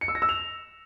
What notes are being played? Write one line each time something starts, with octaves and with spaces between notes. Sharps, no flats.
C#7
E6
A#6
E6
F7